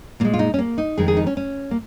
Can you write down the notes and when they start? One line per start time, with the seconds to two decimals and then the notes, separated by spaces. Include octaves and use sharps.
0.20 A#2 A#3
0.25 G#3
0.33 F4
0.39 D#4
0.54 C#4
0.59 A#3
0.78 D#4
0.98 F2 D#3 G#3 G#4
1.08 G#4
1.17 D#4
1.27 C#4
1.37 C#4
1.71 A#3